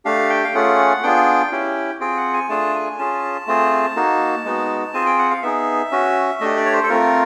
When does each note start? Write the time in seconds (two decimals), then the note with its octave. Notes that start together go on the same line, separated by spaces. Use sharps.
0.05 A3 D4 G4 F5
0.30 G5
0.44 F5
0.54 A3 C#4 F4 G#4 F#5
1.03 B3 D4 F4 G#4 G5
1.52 C#4 E4 G4
2.00 C4 F4 G#4 G5
2.17 F#5
2.33 G#5
2.49 A3 D4 F4 G#4 A5
2.75 G#5
2.98 C#4 F4 G#4 A5
3.47 A3 C4 F4 G#4
3.96 A#3 D#4 F#4
4.45 G#3 B3 D#4 F#4
4.93 C4 F4 G#4 G#5
5.06 G5
5.19 F#5
5.31 F5
5.43 B3 D#4 G#4 E5
5.92 C#4 F#4
6.41 A3 D4 G4 D#5
6.57 D5
6.66 C#5
6.73 C5
6.83 A4
6.89 A3 C4 F4 A#4